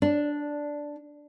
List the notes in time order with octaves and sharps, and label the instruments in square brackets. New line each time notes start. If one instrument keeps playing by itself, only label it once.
[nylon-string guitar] D4